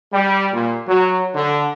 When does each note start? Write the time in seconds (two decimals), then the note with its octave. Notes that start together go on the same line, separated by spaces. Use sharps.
0.13 G3
0.53 A#2
0.88 F#3
1.35 D3